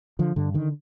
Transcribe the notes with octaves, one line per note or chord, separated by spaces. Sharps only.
D3 F3
G2 D3
D3 D#3